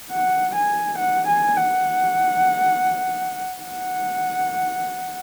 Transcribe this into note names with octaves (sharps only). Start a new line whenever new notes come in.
F#5
G#5
F#5
G#5
F#5
F#5